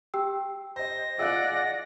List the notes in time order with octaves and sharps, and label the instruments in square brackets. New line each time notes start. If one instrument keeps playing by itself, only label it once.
[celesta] G4 G5 E6
[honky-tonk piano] C5 D#5 [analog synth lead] A#6
[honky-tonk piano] F4 G#4 D#5 [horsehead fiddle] D5 F#5 [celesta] E6 F#6